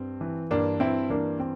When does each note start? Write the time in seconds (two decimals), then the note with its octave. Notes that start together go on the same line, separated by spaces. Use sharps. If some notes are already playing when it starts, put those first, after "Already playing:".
Already playing: G2 C4
0.21 E3
0.51 G2 A#3 D4
0.80 G2 C4 E4
1.10 E3 A#3 D4
1.40 C4